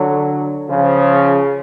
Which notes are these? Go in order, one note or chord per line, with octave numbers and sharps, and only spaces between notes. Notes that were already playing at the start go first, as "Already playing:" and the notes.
Already playing: D3 F#3
C#3 F3